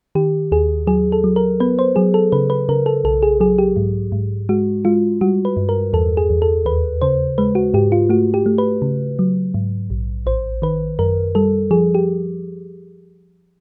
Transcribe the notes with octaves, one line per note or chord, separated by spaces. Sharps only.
D#3 G4
D#2 G#4
F#3 G#4
A4
F#3
A#4
B3 B4
C5
F#3 G#4
A4
C#3 B4
B4
C#3 A#4
A4
B1 A4
G#4
F#3 G#4
G4
G#2
G#2
G#3 F#4
G#3 F4
G3 F#4
B4
G2
A#4
E2 A4
G#4
E2
A4
D#2 B4
C#3 C5
G#3 B4
F#4
G#2 G4
F4
A3 F#4
G4
A3
B4
C#3
F#3
G#2
A#1
A1 C5
D#3 B4
F#2 A#4
G3 A4
F3 G#4
G4